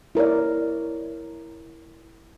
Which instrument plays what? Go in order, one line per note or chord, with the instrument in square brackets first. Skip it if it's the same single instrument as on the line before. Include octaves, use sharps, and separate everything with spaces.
[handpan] E4 A#4 C#5 D5